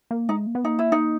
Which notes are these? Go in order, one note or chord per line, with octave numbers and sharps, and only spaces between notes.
A#3
G#3 D#4
A#3
B3
A#3 D#4
E4
D#4